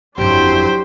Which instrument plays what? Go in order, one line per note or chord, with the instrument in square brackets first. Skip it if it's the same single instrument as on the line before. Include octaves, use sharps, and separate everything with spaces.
[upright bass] G1 F2 [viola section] F#3 D4 E4 [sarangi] G4 [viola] C5